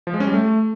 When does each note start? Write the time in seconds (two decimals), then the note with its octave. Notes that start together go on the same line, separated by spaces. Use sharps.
0.07 F3
0.14 G#3
0.20 C#4
0.27 G3
0.34 A3